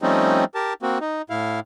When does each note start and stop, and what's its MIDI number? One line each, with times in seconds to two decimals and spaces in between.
0.02 0.45 53
0.02 0.45 55
0.02 0.45 57
0.02 0.45 60
0.02 0.45 61
0.02 0.45 63
0.55 0.74 67
0.55 0.74 70
0.55 0.74 81
0.82 0.98 58
0.82 0.98 60
0.82 0.98 66
1.01 1.22 63
1.30 1.60 45
1.30 1.60 64
1.30 1.60 77